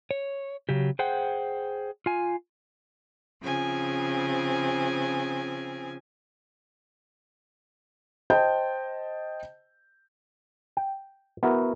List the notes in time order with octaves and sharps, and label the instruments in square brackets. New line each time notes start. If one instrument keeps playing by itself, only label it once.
[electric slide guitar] C#5
C#3 F#3 G4
G#4 C5 F#5 G5
F4 G#5
[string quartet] C#3 F3 C4 G#5
[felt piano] C5 D#5 G5 A5 G6
[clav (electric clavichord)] G5
B3 E4 F#4 A#4